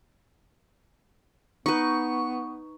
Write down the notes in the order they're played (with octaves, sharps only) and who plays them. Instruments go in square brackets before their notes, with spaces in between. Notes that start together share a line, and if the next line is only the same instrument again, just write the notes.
[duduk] B3 [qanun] D#4 B4 [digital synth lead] C#6